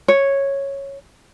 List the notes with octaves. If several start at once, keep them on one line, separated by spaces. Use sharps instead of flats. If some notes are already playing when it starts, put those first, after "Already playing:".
C#5